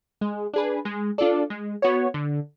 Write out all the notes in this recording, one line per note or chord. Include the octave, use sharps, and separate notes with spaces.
G#3
D4 G#4 B4
G#3
D4 F4 A4 D5
G#3
B3 F#4 C#5
D3